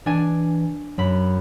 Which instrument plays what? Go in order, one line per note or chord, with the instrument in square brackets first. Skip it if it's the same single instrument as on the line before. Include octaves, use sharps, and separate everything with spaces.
[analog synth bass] E3 [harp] D4 G#5
[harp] F#2 B5 [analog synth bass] F#3